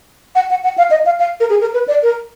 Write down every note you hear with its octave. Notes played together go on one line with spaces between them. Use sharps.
F#5
F#5
F#5
F5
D#5
F5
F5
A#4
G#4
A#4
B4
D5
A#4